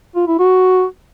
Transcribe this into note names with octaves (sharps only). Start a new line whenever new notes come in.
F4
E4
F#4